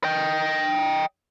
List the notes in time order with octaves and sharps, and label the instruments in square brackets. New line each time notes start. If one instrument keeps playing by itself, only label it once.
[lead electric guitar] D#5 G5